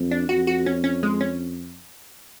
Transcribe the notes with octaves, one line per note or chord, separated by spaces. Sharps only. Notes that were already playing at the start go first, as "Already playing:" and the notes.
Already playing: F2
D4
F2 F#4
F#4
C#4
C#4
G#3
C#4